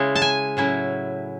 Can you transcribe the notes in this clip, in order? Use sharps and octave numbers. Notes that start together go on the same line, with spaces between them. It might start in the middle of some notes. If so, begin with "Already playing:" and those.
Already playing: C#3 G#3 C#4 E4
A5
G#5
A2 F#3 C#4 E4